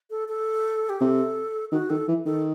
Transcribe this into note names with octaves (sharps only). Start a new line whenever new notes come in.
A4
A4
G4
C3 A4
D#3 F#4
D#3 A4
E3
D#3 A4